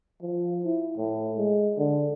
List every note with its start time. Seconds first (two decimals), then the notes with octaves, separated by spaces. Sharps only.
0.22 F3
0.65 E4
0.97 A2
1.37 G#3
1.77 D3